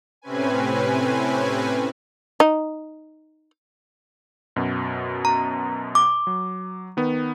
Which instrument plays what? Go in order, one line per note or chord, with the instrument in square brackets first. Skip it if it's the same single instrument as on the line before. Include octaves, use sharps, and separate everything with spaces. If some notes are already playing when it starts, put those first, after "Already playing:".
[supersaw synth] A2 C3 C4 C#4 B4 G#5
[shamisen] D#4
[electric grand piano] F#2 B2
[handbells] A#5
D6
[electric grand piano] F#3
D#3 B3